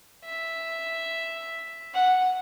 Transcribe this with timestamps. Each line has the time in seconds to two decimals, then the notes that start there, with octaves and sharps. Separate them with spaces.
0.25 E5
1.94 F#5